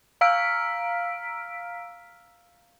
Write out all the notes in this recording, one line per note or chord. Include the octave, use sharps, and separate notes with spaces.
F5 A#5 E6 F6 B6 D7